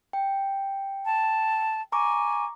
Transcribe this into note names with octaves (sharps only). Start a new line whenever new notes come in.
G5
A5
G#5 A#5 C#6 D6